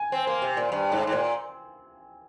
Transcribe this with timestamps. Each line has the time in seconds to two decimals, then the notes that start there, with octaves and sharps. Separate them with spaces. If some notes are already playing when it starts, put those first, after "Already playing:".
Already playing: G#5
0.12 C4
0.27 A#3
0.42 C3
0.57 A#2
0.72 G2
0.92 G#2
1.07 G#2
1.12 A#2